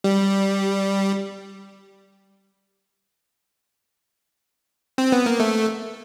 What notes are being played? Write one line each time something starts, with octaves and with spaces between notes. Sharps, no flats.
G3
C4
B3
A#3
A3